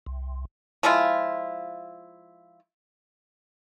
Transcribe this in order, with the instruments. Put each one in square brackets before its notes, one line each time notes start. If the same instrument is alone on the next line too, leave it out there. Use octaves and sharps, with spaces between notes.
[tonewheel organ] C2
[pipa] F3 G#3 E4 F4